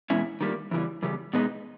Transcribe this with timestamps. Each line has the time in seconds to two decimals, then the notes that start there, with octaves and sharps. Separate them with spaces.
0.10 E2 B2 G#3 C#4 E4
0.41 D#3 G3 A#3
0.71 E2 C#3 E3 G3
1.03 E2 C#3 G3
1.33 B2 G#3 B3 D#4